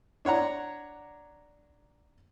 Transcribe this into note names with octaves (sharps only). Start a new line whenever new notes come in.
D4 C#5 F#5 A#5